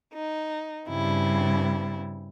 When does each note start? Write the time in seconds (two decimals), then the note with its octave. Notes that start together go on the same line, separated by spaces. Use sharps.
0.13 D#4
0.88 G2 C#3 G3 C4 E4